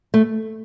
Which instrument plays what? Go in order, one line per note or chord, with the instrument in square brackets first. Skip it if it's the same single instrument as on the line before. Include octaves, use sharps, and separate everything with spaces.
[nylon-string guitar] A3